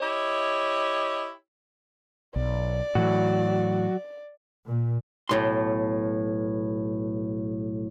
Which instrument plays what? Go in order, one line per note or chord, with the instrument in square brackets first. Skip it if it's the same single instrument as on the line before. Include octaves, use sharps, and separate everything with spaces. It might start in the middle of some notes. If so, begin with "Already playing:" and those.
[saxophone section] E4 G4 C#5 D#5
[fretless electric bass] B1 [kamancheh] D5
[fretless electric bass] A2 E3 [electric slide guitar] F#3 F#4
[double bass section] A#2
[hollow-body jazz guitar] B1 A2 C6